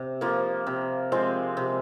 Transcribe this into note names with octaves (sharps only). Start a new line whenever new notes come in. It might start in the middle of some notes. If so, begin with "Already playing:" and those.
Already playing: C3
F3 A#3
C3
F3 G#3 C4
C3